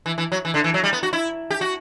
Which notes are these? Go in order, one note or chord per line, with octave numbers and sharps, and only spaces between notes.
E3
E3
F#3
E3
D3
E3
F#3
G3
B3
F#4
E4
G4
F#4